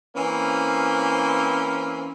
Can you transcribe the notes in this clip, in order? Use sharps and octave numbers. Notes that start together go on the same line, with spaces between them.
E3 A#3 C4 C#4